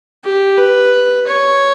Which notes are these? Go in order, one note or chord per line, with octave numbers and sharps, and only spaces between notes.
G4
B4
C#5